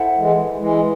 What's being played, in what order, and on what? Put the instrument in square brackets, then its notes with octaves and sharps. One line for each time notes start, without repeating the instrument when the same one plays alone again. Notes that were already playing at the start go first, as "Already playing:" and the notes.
Already playing: [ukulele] E4 A4 C5 F#5
[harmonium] E3 G#3
E3 G#3